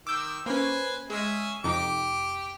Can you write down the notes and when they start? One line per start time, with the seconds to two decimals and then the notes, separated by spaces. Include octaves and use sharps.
0.07 D#3 D6 E6 G6
0.46 A#3 C#4 B4 C5 G#5
1.10 G#3 C#4 G#4 E5
1.64 F2 C3 D#4 G4 D6